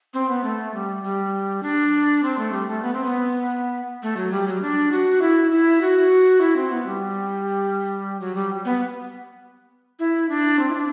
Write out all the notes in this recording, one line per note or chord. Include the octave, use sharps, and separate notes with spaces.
C4
B3
A3
G3
G3
D4
C4
A3
G3
A3
B3
C4
B3
A3
F#3
G3
F#3
D4
F#4
E4
E4
F#4
E4
C4
B3
G3
F#3
G3
B3
E4
D4
C4
E4
D4